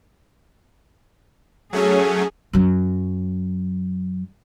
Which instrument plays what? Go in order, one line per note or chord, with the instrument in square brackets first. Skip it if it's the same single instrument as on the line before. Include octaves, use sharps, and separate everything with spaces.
[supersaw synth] F#3 A3 C#4 [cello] G#4
[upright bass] F#2 F#3